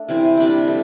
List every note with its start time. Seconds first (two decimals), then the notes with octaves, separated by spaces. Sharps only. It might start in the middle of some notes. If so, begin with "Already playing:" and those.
Already playing: A3 D4
0.08 C3 E3 C4 E4
0.37 C3 G3 D4 G4
0.68 A3